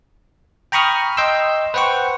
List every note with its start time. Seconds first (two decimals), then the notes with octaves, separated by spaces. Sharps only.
0.72 G5 A#5 B5 C#6 D#6 F6
1.17 D#5 G5 C6 E6
1.74 B4 C5 F#5 G5 C#6